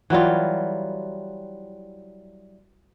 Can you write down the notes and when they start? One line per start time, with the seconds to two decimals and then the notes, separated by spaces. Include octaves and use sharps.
0.10 E3 F#3 G3 F4